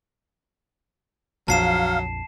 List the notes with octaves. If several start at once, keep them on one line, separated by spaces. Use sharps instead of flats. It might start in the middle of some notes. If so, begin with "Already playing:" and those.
A#1 F2 F#3 F5 A5 C7 E7